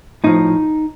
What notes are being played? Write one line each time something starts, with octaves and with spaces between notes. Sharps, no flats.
A2 F3 D#4